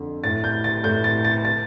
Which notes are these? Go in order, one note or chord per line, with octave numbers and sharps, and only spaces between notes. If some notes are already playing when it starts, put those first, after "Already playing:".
Already playing: F2 D3
A2 A6
G6
A6
A2 G6
A6
A6
A6